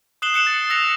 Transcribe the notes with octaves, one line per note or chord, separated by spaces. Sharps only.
D#6 F#6 C7 E7 F#7 G7
F#6 C#7 E7 F#7
A6
E6 F#6 A#6 C#7 F7